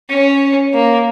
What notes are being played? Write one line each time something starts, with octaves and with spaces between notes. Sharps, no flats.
C#4
A#3